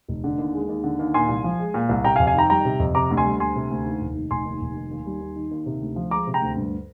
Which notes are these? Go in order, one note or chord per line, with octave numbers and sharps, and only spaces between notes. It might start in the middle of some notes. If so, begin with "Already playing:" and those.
F1
D3
D#2
G#3
D#2
D3
D#2
A#2 G#5 C6
C2
F3
G#3
A#2
C2
C3 G5 A#5
F5 G#5
F2
F5 G#5
D#3 G5 A#5
G3 G5 A#5
C3
F2
C3 A#5 D6
D2
G#5 C6
G3
D2 G#5 C6
C3
D2
D#2
F1
D#3
F1 G#5 C6
D#2
F1
D#3
D#2
G3
D#2
D#3
D#2
C3
D2
F3
G#3 A#5 D6
C3
G5 A#5
D2
G2